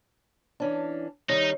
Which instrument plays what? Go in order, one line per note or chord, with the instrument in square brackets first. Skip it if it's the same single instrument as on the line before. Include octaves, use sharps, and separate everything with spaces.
[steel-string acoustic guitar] E3 C#4 D4
[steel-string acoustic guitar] D#3 G3 [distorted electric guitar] D#4 [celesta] C#5